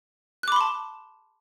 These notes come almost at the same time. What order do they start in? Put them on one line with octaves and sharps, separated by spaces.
F#6 D6 B5 C6 A5